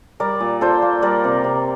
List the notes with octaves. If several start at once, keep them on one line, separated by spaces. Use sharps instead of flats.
G3 A#4 D5
A#2
A#2 A4 C5
A#3
G3 A#4 D5
C3
C3